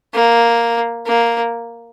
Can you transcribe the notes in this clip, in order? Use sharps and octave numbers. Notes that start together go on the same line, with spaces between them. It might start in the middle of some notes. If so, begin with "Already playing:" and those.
A#3
A#3